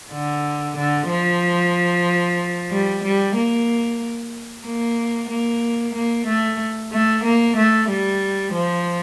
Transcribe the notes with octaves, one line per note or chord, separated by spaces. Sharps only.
D3
D3
F3
G3
G3
A#3
A#3
A#3
A#3
A3
A3
A#3
A3
G3
F3